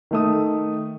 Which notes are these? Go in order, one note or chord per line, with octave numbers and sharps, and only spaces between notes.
D#3 A3 D#6